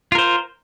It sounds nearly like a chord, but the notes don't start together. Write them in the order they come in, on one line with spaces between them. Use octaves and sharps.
F4 A#4 C5